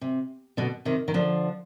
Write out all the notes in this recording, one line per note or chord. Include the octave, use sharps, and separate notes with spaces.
C3
B2 D3
C3 D#3
D#3
D3 F3